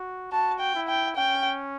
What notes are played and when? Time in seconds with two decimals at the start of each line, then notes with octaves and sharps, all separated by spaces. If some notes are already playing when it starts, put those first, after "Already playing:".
Already playing: F#4
0.32 F#4 A5
0.60 G5
0.75 E4
0.89 G5
1.16 C#4 G5